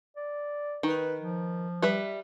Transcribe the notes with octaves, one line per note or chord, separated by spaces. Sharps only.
D5
D#3 B4
F3
G3 B4 E5